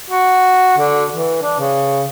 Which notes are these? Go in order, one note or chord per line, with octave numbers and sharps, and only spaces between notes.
F#4
D3
E3
D4
C#3